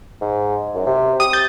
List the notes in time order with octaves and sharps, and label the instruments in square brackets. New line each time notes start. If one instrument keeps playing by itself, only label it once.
[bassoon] G#2
F#2
C3
[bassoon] G4 [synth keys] D#6
[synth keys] G6 A6